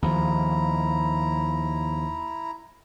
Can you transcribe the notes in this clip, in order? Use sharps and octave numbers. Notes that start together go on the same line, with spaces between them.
D#2 F3 E4 A#5